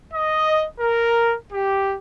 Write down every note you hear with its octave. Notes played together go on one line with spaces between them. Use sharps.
D#5
A#4
G4